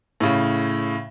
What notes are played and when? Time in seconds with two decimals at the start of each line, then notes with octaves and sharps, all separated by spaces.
0.21 A2 C#3